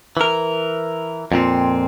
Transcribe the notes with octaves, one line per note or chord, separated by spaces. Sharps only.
E3 A#4
F2 A#2 C4